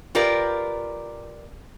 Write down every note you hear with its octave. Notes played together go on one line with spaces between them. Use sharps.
F4 G4 A#4 B4 D5